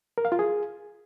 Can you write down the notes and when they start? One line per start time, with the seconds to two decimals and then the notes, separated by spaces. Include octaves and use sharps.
0.18 A#4
0.25 F5
0.32 F4
0.39 G#4